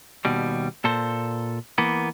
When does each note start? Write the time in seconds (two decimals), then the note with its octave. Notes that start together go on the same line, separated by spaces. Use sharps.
0.25 D#2 B2 G3
0.84 A#2 A4 C5
1.78 E3 A#3 B3